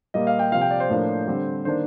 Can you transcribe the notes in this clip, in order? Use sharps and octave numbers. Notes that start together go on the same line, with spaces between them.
A#2 G3 A#3 D#5
F5
G5
C3 F3 C4 F5
G5
D5
C5
A2 F3 A#3 D4
D3 G3 C4
D#3 A#3 D4 C5